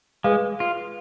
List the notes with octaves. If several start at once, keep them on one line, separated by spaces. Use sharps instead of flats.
G#3 G#4 B4 F5
F4